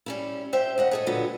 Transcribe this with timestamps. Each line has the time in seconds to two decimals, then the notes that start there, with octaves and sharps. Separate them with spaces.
0.06 G3 C#4 E4
0.53 G4 C5 E5
0.78 D#2 D#5 F#5
0.91 G#4 A4 D#5
1.06 A#2 D3 F#3 B3